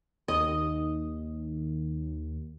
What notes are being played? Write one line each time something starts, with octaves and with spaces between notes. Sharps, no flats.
D#2 D#5